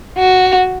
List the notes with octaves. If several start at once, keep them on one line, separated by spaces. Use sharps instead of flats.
F#4